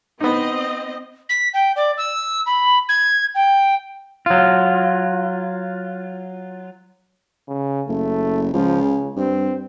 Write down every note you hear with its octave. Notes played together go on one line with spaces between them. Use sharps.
B3 C4 D#4 D#5
B6
G5
D5
E6
B5
G#6
G5
F#3 F4
C#3
F#1 A3
C#2 F3
C#3
G2 C4